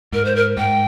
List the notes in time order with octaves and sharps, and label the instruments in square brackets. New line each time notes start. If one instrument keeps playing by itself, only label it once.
[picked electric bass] G#2 [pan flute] A#4
[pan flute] C5
A#4
[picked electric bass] G#2 [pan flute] G5